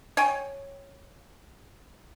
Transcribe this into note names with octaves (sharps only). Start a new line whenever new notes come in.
C#5 G5 G#5